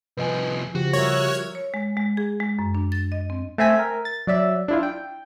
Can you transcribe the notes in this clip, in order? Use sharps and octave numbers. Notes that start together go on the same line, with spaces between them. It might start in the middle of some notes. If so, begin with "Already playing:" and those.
C2 F3 B4 D#5 G#5
C#3 F3 F#4 G4
G3 A#4 C#5 E5
C#5
G#3
G#3
G#4
G#3
F#2
D4
A6
D#5
C4
A3 C4 E5 G#5 B6
A#4
A6
F#3 D5 E5
D4 E4 F4
G5